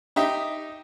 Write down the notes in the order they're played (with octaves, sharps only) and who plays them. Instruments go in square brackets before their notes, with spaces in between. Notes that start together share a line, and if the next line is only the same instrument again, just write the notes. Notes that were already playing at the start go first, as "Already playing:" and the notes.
[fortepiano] D#4 G4 E5 G5